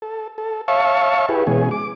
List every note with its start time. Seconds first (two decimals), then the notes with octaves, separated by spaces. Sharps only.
0.02 A4
0.38 A4
0.68 C#5 E5 F5 A5 C#6
1.29 E4 G4 G#4 B4
1.47 B2 E3 G#3 C#4 G#4
1.71 D6